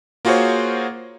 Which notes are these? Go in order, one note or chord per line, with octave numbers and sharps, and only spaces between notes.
A#3 F4 F#4 G#4 C5 C#5